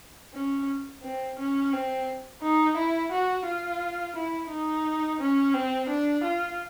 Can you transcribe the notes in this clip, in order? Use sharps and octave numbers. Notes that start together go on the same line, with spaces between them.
C#4
C4
C#4
C4
D#4
E4
F#4
F4
E4
D#4
C#4
C4
D4
F4